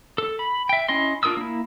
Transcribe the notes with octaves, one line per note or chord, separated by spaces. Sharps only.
A4
B5
E5 G5
C#4 E4 D#5 C6
D4 F4 A#4 D#6 E6
A#3 E4